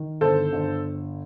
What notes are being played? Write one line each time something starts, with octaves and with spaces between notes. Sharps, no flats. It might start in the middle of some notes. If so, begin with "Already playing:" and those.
Already playing: D#3
G1 A4 C5
G1